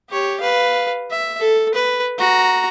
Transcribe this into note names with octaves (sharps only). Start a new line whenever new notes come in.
G4 C#5
B4 F5
E5
A4
B4
F#4 A#5